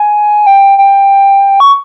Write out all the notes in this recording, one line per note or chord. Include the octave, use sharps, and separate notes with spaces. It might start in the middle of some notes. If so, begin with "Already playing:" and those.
Already playing: G#5
G5
G5
C#6